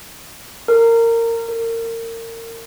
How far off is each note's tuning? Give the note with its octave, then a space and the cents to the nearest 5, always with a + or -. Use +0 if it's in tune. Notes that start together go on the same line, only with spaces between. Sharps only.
A#4 -20
A#4 -30